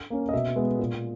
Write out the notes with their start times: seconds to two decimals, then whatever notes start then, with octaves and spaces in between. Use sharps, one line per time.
0.10 A#3 C#4
0.29 D#5
0.33 B2 E5
0.56 G#3 B3
0.79 A#2